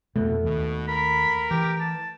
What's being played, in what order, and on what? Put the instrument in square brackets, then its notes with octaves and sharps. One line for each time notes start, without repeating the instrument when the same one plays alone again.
[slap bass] F2 B2 [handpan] A3 [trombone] B3
[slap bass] D#2 [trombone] B2
[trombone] A#4 [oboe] B5
[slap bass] E3 [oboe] G4
[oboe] A5